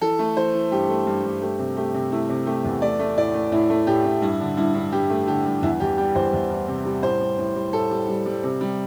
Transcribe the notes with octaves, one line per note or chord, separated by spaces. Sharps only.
E3 A4
A3
E3 C5
E3
G2 G4
A3
G2
G2
A3 G4
C3
A3 G4
C3
A3 E4
C3
A3 G4
E2
A3 D5
A3
A2 D5
A3
A2 E4
A3
A2 G4
A2
G2 E4
D3
G2 E4
G2
G2 G4
A3
D3 G4
G2
E2 E4
E2 G4
G3 G4
E2 C5
E2
E2
C3
G3
A2 C5
G3
A2
G3
A2 A4
G3
G3
G3
C3
G3